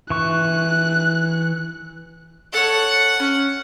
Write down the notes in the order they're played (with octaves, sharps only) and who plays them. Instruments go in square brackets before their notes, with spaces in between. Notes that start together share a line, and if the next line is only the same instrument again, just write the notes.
[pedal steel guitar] E3 C#6 [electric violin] F#6
[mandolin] A4 C#5 [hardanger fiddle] F#5
[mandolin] C#4